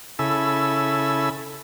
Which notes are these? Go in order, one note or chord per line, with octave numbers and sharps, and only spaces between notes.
C#3 E4 A4 G#5 B5 E6